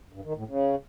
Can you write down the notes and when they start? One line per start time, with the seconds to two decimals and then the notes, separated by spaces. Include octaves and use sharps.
0.13 G2
0.24 D#3
0.36 A2
0.47 C#3